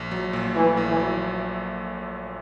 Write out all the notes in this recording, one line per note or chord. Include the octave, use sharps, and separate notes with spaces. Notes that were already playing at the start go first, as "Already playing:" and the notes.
Already playing: A#1
F#3
A#2
E3 A3
A#1
E3
F#3